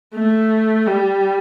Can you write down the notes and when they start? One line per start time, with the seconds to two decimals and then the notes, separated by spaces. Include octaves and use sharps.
0.15 A3
0.87 G3